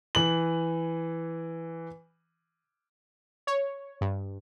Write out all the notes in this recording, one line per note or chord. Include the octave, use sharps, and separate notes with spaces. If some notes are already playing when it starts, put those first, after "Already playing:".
E3 F#7
C#5
G2